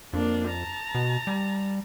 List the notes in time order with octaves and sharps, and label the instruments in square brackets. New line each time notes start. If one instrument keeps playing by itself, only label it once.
[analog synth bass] F2 [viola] A#3 D4
[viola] A5 A#5
[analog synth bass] B2
G3